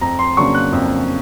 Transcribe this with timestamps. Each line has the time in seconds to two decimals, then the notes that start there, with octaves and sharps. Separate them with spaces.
0.01 F2 A#5
0.19 C6
0.37 C#3 F#3 A#3 D4 C#6
0.55 F#6
0.72 F2